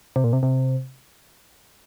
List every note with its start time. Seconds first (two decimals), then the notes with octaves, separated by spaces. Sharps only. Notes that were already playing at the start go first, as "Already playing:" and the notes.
0.16 C3
0.24 A#2
0.33 C3
0.43 C3